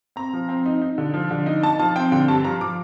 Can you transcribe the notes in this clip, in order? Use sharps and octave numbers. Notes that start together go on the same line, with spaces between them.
C4 A#5
F3
C4
D#4
D#4
D3
F3
D3
D#4
D#4 A5
F3 A5
C4 G5
D3 G5
G2 A5
F3 A#5
F3 D6